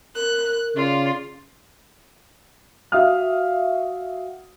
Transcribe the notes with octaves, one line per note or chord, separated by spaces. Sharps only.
A#4 F#6
C#3 F4 D5
F#4 E5 F5 D#6 F6